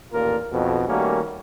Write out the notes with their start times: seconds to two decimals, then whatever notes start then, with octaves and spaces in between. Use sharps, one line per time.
0.13 A1 D#2 A#2 A#3 F4 A#4
0.52 B1 F2 B2
0.88 D#3 G3 A3 A#3 C#4 F#4